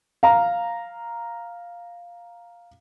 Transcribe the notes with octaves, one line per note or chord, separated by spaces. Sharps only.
F5 A#5